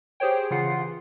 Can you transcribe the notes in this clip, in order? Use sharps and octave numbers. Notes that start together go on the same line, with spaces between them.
G4 G#4 C5 C#5 G5
C#3 E3 F4 F#5 C7